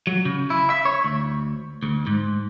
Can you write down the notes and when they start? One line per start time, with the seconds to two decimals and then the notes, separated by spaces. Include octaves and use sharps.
0.07 F#3
0.25 C#3
0.50 E4
0.70 E5
0.85 C#5
1.04 D2
1.83 D2
2.07 G#2